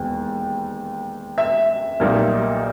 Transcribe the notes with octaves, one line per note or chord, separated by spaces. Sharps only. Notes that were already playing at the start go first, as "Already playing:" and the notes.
Already playing: E1 D#2
E5
B1 A#2 G3 A#3 D#4